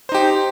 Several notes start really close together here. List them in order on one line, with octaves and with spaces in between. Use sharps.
C5 D#4 G4